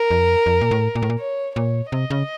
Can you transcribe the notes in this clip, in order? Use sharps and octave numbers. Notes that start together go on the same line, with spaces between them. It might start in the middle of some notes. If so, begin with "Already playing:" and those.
Already playing: A#4
F2
F2
A#2
A2
A#2
A2
A#2
C#5
A#2 C#5
C3 D#5
C#3